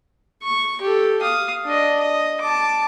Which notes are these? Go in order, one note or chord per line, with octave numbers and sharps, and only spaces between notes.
C#6
G4 A4
F5 D#6
D4 D#5
D#5
A5 D6